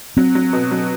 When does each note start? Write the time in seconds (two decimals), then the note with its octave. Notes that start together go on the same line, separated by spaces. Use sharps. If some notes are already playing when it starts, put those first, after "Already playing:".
0.17 F#3 C4
0.35 F#3
0.53 B2
0.71 F#3